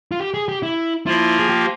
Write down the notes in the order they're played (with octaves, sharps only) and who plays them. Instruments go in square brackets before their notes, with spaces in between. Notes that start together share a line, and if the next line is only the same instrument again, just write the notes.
[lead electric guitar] F4
G4
G#4
G4
E4
[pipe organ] F3 A#3 F4 [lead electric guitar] E4
[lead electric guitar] G#4
G4